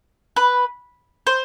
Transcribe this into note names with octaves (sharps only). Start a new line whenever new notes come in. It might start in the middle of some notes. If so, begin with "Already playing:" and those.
B4
C5